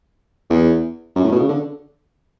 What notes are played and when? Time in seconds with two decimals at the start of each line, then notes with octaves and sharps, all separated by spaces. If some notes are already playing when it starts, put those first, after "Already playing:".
0.50 E2
1.16 F#2
1.24 A2
1.32 B2
1.40 C#3
1.49 D3